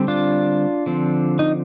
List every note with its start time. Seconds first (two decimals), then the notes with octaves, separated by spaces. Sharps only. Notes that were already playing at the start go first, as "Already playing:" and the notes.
Already playing: D3 G3 C4
0.08 D4 F4
0.86 D3 F3 C4
1.39 D#4